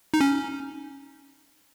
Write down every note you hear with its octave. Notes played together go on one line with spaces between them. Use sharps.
D#4
C#4